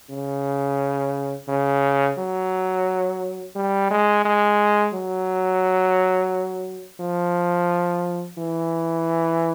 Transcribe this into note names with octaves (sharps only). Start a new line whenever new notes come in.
C#3
C#3
F#3
G3
G#3
G#3
F#3
F3
E3